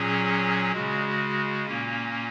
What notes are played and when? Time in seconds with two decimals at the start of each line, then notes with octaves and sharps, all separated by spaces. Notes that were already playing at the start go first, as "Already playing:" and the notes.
Already playing: A#2 F#3 C#4 G#4
0.72 C#3 G#3 F#4
1.66 A#2 A#3 C#4